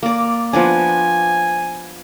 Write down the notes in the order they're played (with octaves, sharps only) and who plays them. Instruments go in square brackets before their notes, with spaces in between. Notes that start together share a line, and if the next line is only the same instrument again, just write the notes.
[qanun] A#3 D5
[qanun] F3 B3 D4 [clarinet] G#5